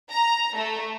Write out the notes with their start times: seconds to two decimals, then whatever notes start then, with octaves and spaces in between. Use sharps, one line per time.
0.11 A#5
0.56 A3